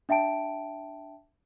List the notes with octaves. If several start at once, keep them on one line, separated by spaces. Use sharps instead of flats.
D4 E5 G5 A5 D7